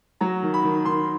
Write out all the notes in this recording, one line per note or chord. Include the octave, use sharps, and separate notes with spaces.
F#3 A#5
D#3
B5
D#3
D#3 C6